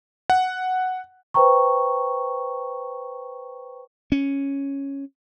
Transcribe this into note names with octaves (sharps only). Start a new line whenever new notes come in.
F#5
B4 C5 G5 A#5 C#6
C#4